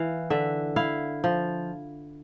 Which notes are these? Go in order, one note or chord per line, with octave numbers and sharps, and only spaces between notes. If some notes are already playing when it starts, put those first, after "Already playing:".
Already playing: E3 F5
D3 E5
E4 F5
F3